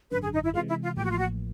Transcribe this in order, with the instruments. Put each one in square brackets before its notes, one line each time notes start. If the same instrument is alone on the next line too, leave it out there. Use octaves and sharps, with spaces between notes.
[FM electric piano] G#1 F#2 D3 [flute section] B4
[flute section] G#4
D#4
E4
[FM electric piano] C3 E3 G#3 [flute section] F4
[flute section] E4
F4
[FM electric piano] A1 A2 F3 A#3 [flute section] G4
[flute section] F#4
F4
F#4